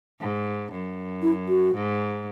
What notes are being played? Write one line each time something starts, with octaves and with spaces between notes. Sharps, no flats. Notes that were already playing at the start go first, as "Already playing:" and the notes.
G#2
F#2
E4
F#4
G#2